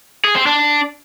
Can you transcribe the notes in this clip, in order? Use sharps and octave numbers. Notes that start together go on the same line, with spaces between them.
G#4
C4
D4